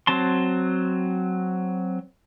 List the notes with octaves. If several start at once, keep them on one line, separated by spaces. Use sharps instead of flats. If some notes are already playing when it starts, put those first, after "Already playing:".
F#3 C4 A5 C6